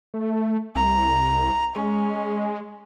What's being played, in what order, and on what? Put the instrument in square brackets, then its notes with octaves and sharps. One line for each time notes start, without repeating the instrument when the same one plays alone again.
[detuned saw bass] A3
[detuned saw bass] C2 [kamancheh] A#5
[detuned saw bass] G#3 [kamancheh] C#4